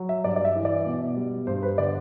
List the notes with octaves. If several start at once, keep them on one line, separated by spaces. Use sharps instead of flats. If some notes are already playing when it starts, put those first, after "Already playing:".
Already playing: F#3
E5
G2 D5
D5
E5
E3
D5
B2
G3
G2 C5
B4
D3 D5